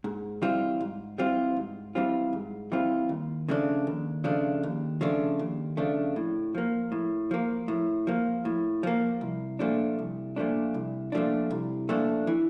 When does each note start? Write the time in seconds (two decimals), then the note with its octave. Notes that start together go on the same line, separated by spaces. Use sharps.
0.04 G#2
0.42 E3 G3 C4 F4
0.81 G#2
1.18 E3 G3 C4 F4
1.56 G#2
1.95 E3 G3 C4 F4
2.33 G#2
2.72 E3 G3 C4 F4
3.09 D#2
3.48 C#3 F3 A3 D4
3.87 D#2
4.24 C#3 F3 A3 D4
4.63 D#2
5.01 C#3 F3 A3 D4
5.39 D#2
5.77 C#3 F3 A3 D4
6.16 A2
6.55 F3 A#3
6.92 A2
7.31 F3 A#3
7.68 A2
8.07 F3 A#3
8.45 A2
8.83 F3 A#3
9.21 C2
9.59 A#2 F3 A3 D4
9.99 C2
10.36 A#2 F3 A3 D4
10.74 C2
11.12 A#2 F3 A3 D4
11.51 C2
11.89 A#2 F3 A3 D4
12.27 E3